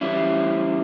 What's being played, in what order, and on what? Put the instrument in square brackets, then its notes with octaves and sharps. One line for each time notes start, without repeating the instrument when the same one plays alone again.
[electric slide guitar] E3 G3 C#4 E4